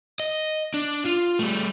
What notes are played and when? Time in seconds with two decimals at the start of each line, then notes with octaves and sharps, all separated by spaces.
0.20 D#5
0.74 D4
1.05 F4
1.39 G3 A3